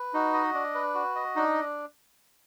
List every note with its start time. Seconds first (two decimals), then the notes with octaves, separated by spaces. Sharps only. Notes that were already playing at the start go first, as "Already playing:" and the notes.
Already playing: B4
0.14 D#4 F#4
0.34 D#5
0.54 D4
0.75 B4
0.95 F#4
1.15 D#5
1.36 D4 D#4